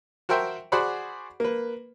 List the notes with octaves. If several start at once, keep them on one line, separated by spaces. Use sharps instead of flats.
F#4 A#4 C5 E5 G5
F#4 G#4 C5 D5 F#5 B5
A#3 B4